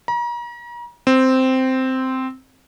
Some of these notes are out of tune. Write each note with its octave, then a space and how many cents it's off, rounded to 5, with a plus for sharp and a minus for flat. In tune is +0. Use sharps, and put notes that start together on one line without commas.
A#5 +40
C4 -5